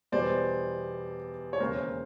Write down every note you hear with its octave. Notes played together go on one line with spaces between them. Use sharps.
E2 B2 G3 B3 C5 D5
C#5
E1 D#2 C#3 A#4 C5